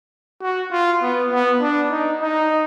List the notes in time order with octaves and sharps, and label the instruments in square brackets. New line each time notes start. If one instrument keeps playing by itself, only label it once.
[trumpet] F#4
F4
B3
B3
D4
D#4
D#4